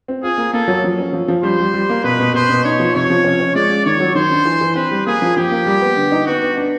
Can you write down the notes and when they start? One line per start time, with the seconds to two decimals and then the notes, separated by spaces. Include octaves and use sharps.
0.08 C4
0.23 F4 G#4
0.38 A#3
0.53 A#3 A4
0.68 F#3
0.84 F3
0.99 C#4
1.13 F3
1.28 F3
1.43 G3 C5
1.59 G3
1.74 G3
1.89 A#3
2.04 B2 B4
2.20 B2
2.34 B2 C5
2.49 B2
2.64 D#4 C#5
2.80 F3
2.95 C3 C#5
3.10 F3
3.24 C#4
3.40 C#4
3.55 G#3 D5
3.70 F4
3.85 D#3 C#5
4.00 F#3
4.15 D#3 C5
4.31 D4
4.45 E3
4.61 E3
4.75 C4 B4
4.91 G3
5.06 A#3 G#4
5.22 F3
5.36 F3 G4
5.51 A#3
5.66 G3
5.81 B3
5.97 D3
6.12 D#4
6.26 B3 F#4
6.42 B3
6.57 D4